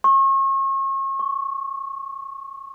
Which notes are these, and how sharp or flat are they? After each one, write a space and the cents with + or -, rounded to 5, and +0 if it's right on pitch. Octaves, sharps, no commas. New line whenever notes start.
C#6 -40
C#6 +10